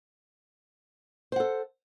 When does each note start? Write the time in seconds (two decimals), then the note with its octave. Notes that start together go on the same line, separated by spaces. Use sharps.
1.32 C5
1.36 F#5
1.40 A4